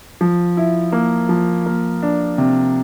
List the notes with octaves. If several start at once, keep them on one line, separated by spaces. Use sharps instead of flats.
F3
E4
A#3
F3
A#3
D4
C3